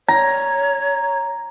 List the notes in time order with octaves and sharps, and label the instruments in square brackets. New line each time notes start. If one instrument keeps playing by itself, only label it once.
[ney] C#5 [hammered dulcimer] A#5